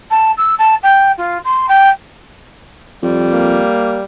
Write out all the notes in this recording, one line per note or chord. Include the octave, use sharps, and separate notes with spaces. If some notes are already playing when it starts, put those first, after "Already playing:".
A5
E6
A5
G5
F4
C6
G5
F2 G3
A#3